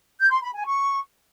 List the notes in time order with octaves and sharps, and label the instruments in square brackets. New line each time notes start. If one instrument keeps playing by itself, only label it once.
[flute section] G6
C6
B5
G#5
C#6